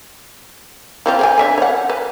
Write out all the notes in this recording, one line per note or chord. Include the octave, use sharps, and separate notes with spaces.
E3 C4 F4
G#4 G5 G#5
D3 E5 G#5
C#5 F#5
B4